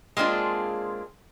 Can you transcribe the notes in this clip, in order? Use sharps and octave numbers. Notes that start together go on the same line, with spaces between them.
G#3 A#3 C4 D4 F4 G#4